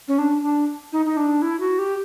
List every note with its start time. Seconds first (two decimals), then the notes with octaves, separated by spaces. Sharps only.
0.08 C#4
0.19 D4
0.42 D4
0.93 D#4
1.06 D#4
1.17 D4
1.42 E4
1.60 F#4
1.79 G4